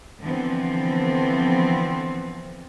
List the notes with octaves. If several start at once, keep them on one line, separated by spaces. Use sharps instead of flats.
D3 E3 F3 B3 C4